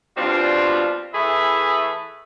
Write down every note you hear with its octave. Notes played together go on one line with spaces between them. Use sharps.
B2 G3 C4 D4 F4
E3 A3 G#4 E5 B5